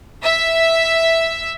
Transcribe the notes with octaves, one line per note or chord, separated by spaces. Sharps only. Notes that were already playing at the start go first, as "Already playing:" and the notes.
E5